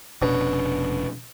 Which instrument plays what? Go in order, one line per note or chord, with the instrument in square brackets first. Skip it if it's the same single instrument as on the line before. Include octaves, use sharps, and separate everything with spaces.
[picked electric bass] F1 C#4 D4 [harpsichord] B2